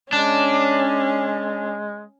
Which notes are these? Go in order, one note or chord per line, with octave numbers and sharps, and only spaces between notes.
G#3 C#4 D4